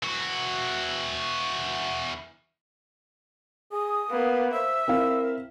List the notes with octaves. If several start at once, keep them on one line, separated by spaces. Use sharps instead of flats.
E3 F#4
G#4 D#6
A#3 B3 B4
C5 E5 E6
C4 E4 A#4 F5